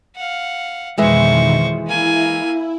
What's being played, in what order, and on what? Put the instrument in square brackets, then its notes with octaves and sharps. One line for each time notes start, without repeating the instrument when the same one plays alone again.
[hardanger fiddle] F5 F#5
[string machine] F2 B2 D#3 [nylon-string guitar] E3 G#3 E5 [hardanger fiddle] C5 C#6
[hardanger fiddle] A#3 G#5 [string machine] E4